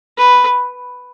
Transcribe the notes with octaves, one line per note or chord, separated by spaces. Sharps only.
B4